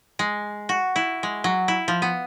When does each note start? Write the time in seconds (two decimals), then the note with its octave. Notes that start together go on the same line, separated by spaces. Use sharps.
0.19 G#3
0.69 F#4
0.96 E4
1.23 G#3
1.44 F#3
1.68 E4
1.88 F3
2.02 B3